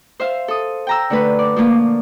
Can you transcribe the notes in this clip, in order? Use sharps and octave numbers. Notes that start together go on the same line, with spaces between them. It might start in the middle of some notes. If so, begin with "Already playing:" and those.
C5 E5 F5
A4 D#6
G5 A#5 E6
D3 A3 B4
D5
F3 A3 A#3 F4